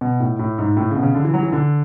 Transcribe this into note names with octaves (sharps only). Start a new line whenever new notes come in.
B2
A2
A2
G#2
A2
C#3
B2
C#3
D3
E3
F#3
E3
D3